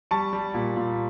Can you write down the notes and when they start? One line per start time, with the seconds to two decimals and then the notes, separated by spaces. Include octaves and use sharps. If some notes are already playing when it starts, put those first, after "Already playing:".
0.11 G3 A5 C#6
0.33 G3
0.54 A#2
0.76 A#2